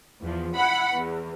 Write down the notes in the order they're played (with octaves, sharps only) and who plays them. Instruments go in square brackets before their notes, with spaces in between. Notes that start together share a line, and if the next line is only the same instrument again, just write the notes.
[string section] E2 F3
E4 F#5 B5
E2